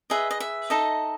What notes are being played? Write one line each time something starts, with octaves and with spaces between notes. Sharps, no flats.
G#4 B4 D#5 E5
D#5
E5
D#4 A4 D#5